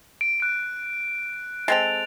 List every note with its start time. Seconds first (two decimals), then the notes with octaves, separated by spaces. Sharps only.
0.21 D7
0.40 F#6 D7
1.68 G#3 C4 A4 A6 F7